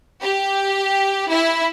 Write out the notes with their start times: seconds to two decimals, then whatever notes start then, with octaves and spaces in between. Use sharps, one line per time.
0.23 G4
1.29 E4 E5